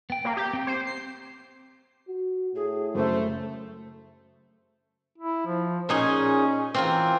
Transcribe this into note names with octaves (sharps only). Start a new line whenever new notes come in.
B3 G5
A#3
G4
C4
C5
C7
F#4
A2 G#4
F#2 C#3 A3 C5 E6
E4
F3
A#2 C#4 D#4 G#4
E3 C4 F4 A#4